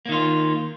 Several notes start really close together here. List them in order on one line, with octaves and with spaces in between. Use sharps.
A#3 D#3 F4